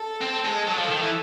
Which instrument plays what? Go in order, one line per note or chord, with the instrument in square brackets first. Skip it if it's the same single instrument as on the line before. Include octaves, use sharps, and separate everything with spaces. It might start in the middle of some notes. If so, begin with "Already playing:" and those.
Already playing: [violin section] A4
[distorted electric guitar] C4
G#3
F#3
F3
D#3
E3